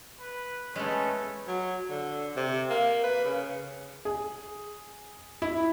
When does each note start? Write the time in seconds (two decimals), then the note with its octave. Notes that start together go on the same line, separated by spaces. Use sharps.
0.20 B4
0.76 G#3 A3 B3 C#4
1.47 F#3
1.90 D3
2.36 C3
2.70 A#3
3.03 B4
3.24 C#3
4.05 G#4
5.42 E4